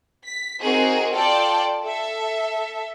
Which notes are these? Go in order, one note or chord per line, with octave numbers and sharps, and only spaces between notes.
B6
C4 D#4 F#4 G#4 A#4
F4 A4 D5 G5 A5
A4 E5